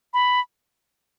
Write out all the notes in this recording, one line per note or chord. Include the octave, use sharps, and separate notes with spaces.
B5